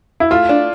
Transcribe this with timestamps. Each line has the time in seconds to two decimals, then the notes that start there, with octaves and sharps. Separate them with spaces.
0.20 E4
0.31 A3 F4
0.49 D4